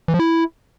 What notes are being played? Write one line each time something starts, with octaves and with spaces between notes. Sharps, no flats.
E3
F3
E4